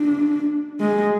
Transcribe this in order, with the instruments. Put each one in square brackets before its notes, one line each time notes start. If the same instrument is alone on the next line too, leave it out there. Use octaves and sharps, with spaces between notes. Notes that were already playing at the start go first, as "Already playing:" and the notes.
Already playing: [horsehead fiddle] D4
G#3